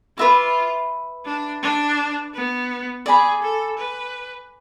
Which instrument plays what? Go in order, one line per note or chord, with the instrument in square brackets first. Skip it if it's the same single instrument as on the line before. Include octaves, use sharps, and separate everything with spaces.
[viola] F4 [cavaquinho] B4 E5 B5 D6
[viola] D4
D4
B3
[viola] G#4 [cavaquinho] D5 G#5 B5
[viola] A4
B4